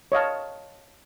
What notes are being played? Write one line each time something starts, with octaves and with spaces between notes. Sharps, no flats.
C#5 D#5 F5 A5